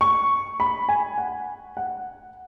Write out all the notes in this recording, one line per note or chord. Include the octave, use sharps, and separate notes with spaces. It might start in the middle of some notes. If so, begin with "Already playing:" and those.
C#6
B5
G#5
F#5
F#5